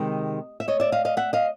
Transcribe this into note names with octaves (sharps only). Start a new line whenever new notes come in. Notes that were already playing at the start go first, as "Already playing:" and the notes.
Already playing: C3 D#3 G#3 D#5
E5
C#5 D#5
D5 E5
D#5 F5
D#5 F5
E5 F#5
D#5 F5